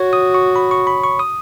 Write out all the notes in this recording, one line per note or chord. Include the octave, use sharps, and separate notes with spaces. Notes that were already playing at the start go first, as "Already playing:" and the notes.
Already playing: F#4 C#5
D#6
C#6
B5
C#6
B5
C#6
D#6